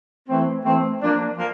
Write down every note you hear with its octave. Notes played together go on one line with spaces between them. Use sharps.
E3 A3 C4
E3 A3 C4
F3 A#3 D4
F3 A#3